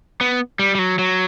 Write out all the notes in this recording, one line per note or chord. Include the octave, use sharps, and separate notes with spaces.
B3
G3
G3
F#3
F#3